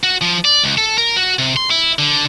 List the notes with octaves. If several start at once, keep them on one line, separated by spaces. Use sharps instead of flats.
F#4
F3
D5
C#2
A4
A#4
F#4
C3
C6
E4
D3